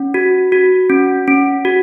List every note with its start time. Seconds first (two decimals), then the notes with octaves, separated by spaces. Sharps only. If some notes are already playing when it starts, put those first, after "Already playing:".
Already playing: C#4
0.14 F#4
0.52 F#4
0.90 C#4
1.28 C#4
1.65 F#4